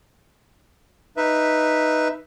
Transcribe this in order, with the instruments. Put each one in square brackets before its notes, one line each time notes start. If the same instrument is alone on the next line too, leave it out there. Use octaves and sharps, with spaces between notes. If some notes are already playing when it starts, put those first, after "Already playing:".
[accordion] D#4 B4 E5